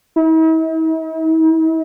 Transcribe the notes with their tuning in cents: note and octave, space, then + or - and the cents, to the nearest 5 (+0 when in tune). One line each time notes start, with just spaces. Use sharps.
E4 -45